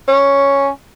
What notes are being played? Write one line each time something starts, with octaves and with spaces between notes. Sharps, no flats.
C#4